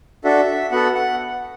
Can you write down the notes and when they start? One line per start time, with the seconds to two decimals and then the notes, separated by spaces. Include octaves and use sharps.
0.24 D4 F#4 A4 E5
0.71 B3 F#4 A4 F#5
0.94 F#5